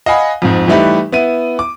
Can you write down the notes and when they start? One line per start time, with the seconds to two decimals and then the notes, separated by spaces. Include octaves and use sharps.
0.06 D#5 F5 F#5 G#5 B5
0.42 F2 G#2
0.68 E3 G3 A3 D#4 G4 B4
1.12 B3 E4 D#7
1.59 D6